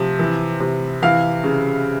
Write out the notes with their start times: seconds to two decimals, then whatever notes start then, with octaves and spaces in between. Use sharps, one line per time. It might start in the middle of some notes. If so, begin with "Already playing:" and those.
Already playing: C3 F3
0.19 E3
0.60 C3
1.02 E3 F5
1.44 C#3